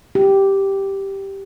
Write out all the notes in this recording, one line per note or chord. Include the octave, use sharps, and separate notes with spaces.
G4